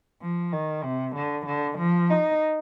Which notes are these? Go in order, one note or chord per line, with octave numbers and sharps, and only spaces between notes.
F3
D#3
C3
D3
D3
F3
D#4